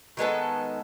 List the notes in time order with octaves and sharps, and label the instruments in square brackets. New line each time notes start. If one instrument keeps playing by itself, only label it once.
[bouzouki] D#3 G#3 B3 A4